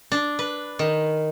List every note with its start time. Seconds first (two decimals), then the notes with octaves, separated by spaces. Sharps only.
0.12 D4
0.39 B4
0.79 D#3